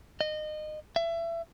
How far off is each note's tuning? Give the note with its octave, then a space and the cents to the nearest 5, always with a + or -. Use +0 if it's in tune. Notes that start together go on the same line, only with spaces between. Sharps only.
D#5 -25
E5 +25